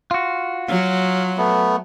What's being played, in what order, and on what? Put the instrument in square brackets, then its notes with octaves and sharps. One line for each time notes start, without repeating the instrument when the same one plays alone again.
[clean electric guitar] F4 F#4
[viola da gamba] F#3 [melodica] F5
[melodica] A3 B3